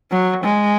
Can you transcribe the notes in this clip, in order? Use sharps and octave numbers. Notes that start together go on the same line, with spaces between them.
F#3
G#3